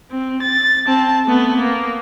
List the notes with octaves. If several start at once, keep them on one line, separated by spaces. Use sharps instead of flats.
C4
A6
C4 A5
A3 B3
A#3